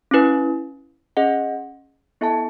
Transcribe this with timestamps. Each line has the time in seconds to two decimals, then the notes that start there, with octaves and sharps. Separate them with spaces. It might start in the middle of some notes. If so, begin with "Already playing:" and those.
0.11 C#4 E4 B4
1.17 C#4 G#4 D#5 F#5
2.21 B3 E4 A4 E5 A5